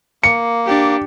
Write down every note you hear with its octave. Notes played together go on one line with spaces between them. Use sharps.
A#3 C#7
D4 G4